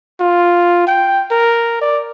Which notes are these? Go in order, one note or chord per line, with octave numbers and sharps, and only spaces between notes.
F4
G5
A#4
D5